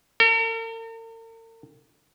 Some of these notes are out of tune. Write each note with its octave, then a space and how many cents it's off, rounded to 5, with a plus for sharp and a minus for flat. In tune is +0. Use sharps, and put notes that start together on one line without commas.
A#4 -45